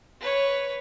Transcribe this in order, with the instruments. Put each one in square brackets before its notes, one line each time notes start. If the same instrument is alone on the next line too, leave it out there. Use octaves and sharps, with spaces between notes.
[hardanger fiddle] B4 C#5